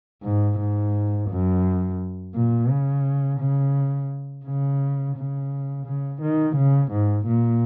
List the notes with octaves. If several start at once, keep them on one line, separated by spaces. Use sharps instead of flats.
G#2
G#2
F#2
A#2
C#3
C#3
C#3
C#3
C#3
D#3
C#3
G#2
A#2